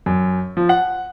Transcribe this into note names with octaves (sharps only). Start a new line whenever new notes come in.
F#2
F3
F#5